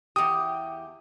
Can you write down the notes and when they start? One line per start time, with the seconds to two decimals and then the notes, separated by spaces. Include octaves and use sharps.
0.16 E2 G4 D#6